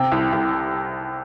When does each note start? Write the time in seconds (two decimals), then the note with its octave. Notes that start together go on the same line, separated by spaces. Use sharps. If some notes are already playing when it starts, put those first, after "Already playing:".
Already playing: C3 G5
0.12 C2
0.33 C2